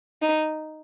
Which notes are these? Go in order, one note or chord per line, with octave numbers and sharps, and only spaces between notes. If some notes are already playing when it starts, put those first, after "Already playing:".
D#4